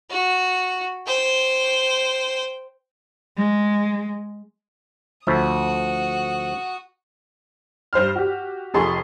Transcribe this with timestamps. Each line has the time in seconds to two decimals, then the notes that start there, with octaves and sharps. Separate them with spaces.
0.10 F#4
1.07 C5 G5
3.37 G#3
5.27 D2 F3 F#4 E5 D#6
7.93 G2 C5 C6 F6
8.16 F#4 G4
8.74 F1 F2 G#4 A4 C6 C#6